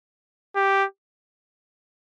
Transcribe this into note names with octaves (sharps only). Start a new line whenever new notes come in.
G4